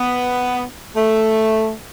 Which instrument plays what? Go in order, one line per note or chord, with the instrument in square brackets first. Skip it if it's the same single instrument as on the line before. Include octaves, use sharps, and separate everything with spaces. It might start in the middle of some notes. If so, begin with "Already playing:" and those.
Already playing: [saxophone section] B3
A3